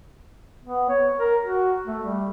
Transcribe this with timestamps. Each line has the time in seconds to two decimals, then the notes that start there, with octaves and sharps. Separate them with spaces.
0.65 B3
0.89 C#5
1.19 A#4
1.42 F#4
1.86 A3
2.03 G3